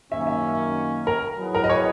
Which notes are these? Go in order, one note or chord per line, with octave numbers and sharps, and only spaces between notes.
F#2 D#3 A#3 C#4 E5
E5
A#4
F#3 B3 E4 G#4 B4
A#4
D#5
C#5